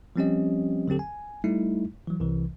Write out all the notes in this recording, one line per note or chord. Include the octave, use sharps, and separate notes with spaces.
F3 G3 C4 C#4 G4 D#5
D3 F#3 C4 G4 A4
G#5
G3 A3 D#4 E4
E3 F#3
C2 C3 E3